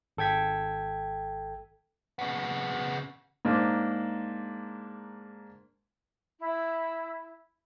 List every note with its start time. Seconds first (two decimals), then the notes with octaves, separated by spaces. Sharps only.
0.17 G#1 A4 G5 G#6 B6
2.19 C#3 B3
3.45 G#2 A#3 D4
6.39 E4